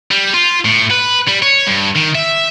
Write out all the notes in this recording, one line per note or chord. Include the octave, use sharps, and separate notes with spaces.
G3
F4
A2
B4
G3
C#5
G2
D#3
E5